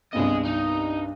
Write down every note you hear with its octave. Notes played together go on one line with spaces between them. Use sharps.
C2 G2 B3 G#4 D#5
D#4